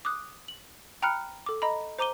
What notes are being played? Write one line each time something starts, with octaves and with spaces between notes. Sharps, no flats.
D6 D#6 F#6
F#7
G5 A#5 B5 F6 F#6 C#7
A4 D6
D#5 A#5 B5
C5 A#5 D6 D#7 G7